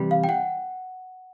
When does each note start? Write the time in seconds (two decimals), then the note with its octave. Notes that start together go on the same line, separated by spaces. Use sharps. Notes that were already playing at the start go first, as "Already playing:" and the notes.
Already playing: C3 E3 G3
0.11 F5
0.24 G5
0.29 F#5